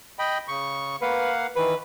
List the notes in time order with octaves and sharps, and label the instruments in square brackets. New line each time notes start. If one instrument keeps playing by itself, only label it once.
[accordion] D#5 G5 B5
C#3 C#6
[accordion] A#3 F5 F#5 [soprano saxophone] B4
[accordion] D#3 E3 [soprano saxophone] B4